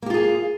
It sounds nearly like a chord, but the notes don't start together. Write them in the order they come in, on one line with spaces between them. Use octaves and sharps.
A#3 G4 F4 G#4